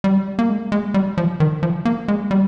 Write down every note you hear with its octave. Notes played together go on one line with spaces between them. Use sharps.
G3
A#3
G#3
G#3
G3
F3
D#3
F3
A#3
G#3
G3